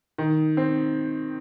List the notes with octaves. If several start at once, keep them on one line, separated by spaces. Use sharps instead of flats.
D#3
C4